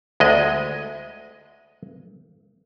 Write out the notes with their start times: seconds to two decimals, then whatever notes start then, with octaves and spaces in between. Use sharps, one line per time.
0.20 D2 G#3 D#5